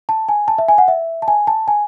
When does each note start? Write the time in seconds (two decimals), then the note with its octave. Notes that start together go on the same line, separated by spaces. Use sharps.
0.09 A5
0.29 G#5
0.48 A5
0.58 E5
0.68 G#5
0.78 F#5
0.88 E5
1.22 A5
1.28 G#5
1.47 A5
1.68 G#5